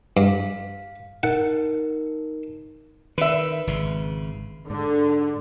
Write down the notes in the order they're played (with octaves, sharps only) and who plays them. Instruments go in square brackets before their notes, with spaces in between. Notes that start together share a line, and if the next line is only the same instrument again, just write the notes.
[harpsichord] G2 [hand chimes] F5
[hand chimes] D#4 A#4 [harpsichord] F#5
[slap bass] D#3 [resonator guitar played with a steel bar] B4 E5
[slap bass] G#1 C#3
[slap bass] G#2 [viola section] D3